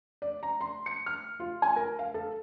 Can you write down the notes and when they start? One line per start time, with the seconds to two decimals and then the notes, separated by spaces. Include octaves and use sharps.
0.22 D5
0.43 A#5
0.61 C6
0.86 C#7
1.06 F6
1.40 F4
1.62 G#5
1.76 A#4
1.99 F5
2.14 A4